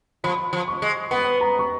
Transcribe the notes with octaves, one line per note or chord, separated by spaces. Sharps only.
F3 B5
F3
C#6
G#3
B3 B5
A#5
C#6